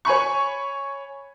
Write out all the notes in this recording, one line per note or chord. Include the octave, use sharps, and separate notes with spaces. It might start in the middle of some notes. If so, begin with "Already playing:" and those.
C#5 G#5 B5 C#6